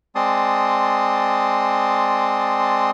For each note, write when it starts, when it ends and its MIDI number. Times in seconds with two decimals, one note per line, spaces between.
0.15 2.91 56
0.15 2.91 60
0.15 2.91 74
0.15 2.91 81
0.15 2.91 84
0.15 2.91 87